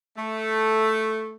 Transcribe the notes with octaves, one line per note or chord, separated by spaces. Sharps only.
A3